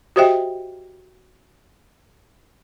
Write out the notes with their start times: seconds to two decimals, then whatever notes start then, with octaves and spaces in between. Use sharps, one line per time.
0.16 F#4 G4 C5 D#5 E5 G5